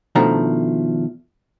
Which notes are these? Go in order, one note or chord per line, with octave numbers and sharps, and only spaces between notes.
B2 D#3 F3 A3 D4 A#5